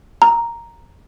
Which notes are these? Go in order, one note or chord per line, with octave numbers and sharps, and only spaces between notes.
A#5